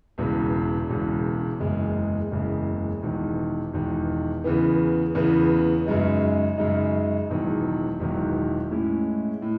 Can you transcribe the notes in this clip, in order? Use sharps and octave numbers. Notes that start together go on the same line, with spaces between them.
E1 E2 C#3
E1 E2 C#3
F#1 E2 C#3 G#3
F#1 E2 C#3 G#3
E1 E2 D#3
E1 E2 D#3
E2 C#3 E3 B3
E2 C#3 E3 B3
F#2 C#3 G#3 D#4
F#2 C#3 G#3 D#4
E1 E2 D#3 F#3
E1 E2 D#3 F#3
A2 G#3 C#4 E4
A2